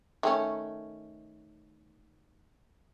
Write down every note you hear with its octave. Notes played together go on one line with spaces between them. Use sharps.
D#3 A3 C#4